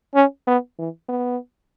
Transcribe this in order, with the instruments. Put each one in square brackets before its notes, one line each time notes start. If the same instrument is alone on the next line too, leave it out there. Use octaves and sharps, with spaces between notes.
[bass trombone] C#4
B3
E3
B3